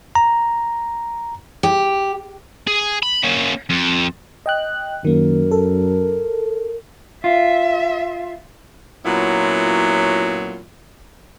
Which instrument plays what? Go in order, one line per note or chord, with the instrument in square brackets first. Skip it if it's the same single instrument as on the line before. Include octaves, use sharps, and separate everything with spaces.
[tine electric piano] A#5
[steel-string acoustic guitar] G4
[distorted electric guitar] G#4
B5
A#3 C#4
F2
[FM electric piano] D#5 G5 F#6
[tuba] F#2 [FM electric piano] D#3 A#3 [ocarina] A#4
[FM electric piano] A4
[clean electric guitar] F4 [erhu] E5
[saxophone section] A#2 F#3 B3 C#4 E4 F4